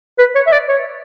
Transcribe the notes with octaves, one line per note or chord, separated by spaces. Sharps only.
B4
C#5
E5
D5
C#5